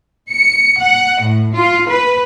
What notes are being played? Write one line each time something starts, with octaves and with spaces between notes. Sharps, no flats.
C#7
F#5
A2
F4
B4